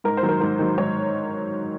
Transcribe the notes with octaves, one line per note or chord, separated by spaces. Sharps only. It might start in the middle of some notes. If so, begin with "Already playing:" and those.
G#2 A#4
C5
D#3 F#3
A#4
G#2 A#4
D#3 F#3
G#2 C#5